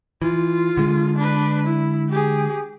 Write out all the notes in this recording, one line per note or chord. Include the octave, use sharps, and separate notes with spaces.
E3 F4
D3 G#3
D4 B4
E4
G4 G#4